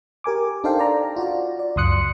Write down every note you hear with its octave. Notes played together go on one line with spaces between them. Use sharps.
G4 A#4 G#5 D6
D4 D#4 A4 C5 F5 G5
D5 A#5
F4 F#4 D5
D5
C#2 F#2 C6 D#6 F#6 C#7